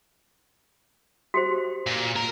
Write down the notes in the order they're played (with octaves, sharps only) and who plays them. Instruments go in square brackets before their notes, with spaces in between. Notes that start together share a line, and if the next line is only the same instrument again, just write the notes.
[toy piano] F#4 G4 C5
[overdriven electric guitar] A#2
A#4